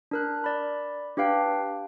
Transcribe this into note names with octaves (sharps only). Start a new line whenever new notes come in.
D4 A#4 F#6
D5 B5
D4 G4 B4 F5 G5